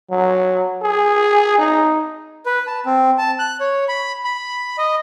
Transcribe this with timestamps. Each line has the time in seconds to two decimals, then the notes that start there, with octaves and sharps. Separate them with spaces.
0.11 F#3
0.82 G#4
1.58 D#4
2.46 B4
2.67 A5
2.86 C4
3.18 A5
3.39 F#6
3.60 C#5
3.89 B5
4.25 B5
4.78 D#5